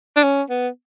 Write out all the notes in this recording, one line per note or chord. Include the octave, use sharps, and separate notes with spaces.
D4
C#4
B3